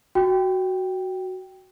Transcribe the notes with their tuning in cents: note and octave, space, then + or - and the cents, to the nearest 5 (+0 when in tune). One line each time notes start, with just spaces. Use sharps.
F#4 +10 G5 +0